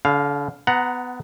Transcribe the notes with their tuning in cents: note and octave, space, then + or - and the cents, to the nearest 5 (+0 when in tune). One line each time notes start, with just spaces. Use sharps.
D3 -40 F5 +0
B3 +20 F#5 +0 A#5 +0